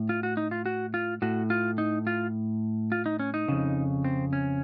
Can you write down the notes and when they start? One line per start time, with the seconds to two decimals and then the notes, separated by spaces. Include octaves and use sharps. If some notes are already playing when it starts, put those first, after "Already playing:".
Already playing: A2
0.09 F4
0.23 F#4
0.37 D#4
0.51 F4
0.66 F#4
0.94 F4
1.22 A2 F#4
1.50 F4
1.78 D#4
2.07 F4
2.92 F4
3.06 D#4
3.19 C#4
3.34 D#4
3.48 F2 C#3
4.05 C4
4.33 C#4